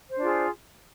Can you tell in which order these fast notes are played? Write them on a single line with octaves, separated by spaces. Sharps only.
C5 D4 F4 G#4